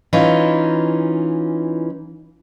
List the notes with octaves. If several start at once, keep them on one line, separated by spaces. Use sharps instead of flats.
E3 C#4 D#4 F4